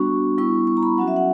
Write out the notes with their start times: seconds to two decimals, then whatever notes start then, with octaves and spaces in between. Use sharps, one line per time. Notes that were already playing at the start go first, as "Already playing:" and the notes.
Already playing: G3 B3 D4 F#4 C#6
0.38 G3 B3 E4 C#6
0.67 C#6
0.77 A#5
0.83 B5
0.98 F#3 C#4 F#4 F#5
1.08 E5
1.16 F#5